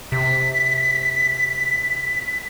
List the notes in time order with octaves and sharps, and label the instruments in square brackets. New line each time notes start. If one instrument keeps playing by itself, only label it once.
[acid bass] C3 [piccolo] B6